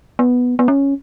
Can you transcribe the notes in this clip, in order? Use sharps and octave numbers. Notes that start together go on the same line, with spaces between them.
B3
B3
C#4